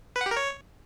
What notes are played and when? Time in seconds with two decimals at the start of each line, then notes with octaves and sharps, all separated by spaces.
0.16 B4
0.21 F#5
0.26 G4
0.31 A#4
0.37 C#5